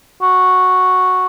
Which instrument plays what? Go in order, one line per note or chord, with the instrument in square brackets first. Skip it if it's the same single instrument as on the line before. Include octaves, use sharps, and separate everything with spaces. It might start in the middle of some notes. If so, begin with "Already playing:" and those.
[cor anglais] F#4